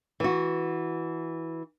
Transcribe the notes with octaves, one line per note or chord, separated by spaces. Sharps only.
E3 F#4